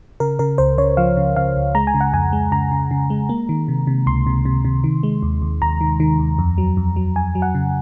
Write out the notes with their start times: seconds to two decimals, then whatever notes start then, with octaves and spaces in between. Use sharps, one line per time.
0.20 C#3 A#4
0.39 C#3 A#4
0.58 C#2 C5
0.78 C#3 C#5
0.97 F3 F5
1.17 C#3
1.36 C#3 F5
1.56 C#2
1.75 G#3 A#5
1.87 G#5
1.94 C#3
2.01 F#5
2.13 F2 G#5
2.33 G#3
2.52 C#3 A#5
2.71 C#3
2.91 C#3
3.10 G#3
3.29 A#3
3.49 D#3
3.68 C3
3.87 C3
4.06 C#2 C6
4.27 C3
4.45 C3
4.65 C3
4.84 D#3
5.03 G#3
5.22 D#2
5.42 D#2
5.62 D#2 A#5
5.81 D#3
6.00 D#3
6.19 D#2
6.38 F2
6.58 F#3
6.77 F2
6.96 F#3
7.16 F2 G#5
7.35 F#3
7.42 F#5
7.55 C#3